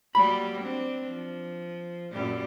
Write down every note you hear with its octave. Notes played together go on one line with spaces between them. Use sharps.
F#3 G3 A#3 B5
C4 D4
F3
F#2 A#2 G3